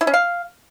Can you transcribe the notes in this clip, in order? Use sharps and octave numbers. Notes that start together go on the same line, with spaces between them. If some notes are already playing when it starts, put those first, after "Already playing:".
E4
C#4
F5